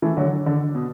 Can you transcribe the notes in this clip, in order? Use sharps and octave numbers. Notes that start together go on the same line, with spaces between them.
E3 A3
D3 F#3
D3
B2